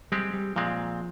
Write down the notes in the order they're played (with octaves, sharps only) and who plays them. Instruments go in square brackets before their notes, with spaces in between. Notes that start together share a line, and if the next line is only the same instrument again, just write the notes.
[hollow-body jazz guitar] G3 [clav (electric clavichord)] G#3 C4 G4
[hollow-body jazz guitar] G3
[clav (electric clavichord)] A#2 G#3 C4 [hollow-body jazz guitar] F3